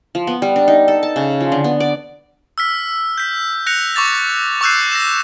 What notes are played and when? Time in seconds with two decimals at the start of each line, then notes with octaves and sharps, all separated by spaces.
0.15 F3
0.27 B3
0.42 G3
0.56 D4
0.68 D#4
0.88 A4
1.03 A5
1.16 C#3
1.41 F3
1.52 D3
1.64 B3
1.80 D5
2.58 E6 F6 B6
3.18 G6 B6
3.67 F#6 A#6 C#7 F7
3.95 C#6 D6 A6 F7
4.61 C#6 D6 E6 F#6 G6 C7
4.92 A#6 E7